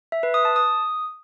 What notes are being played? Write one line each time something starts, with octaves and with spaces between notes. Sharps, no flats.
E5
B4
D#6
A5
D#6